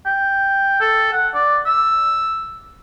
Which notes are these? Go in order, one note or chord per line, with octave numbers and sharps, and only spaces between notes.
G5
A4
F#5
D5
E6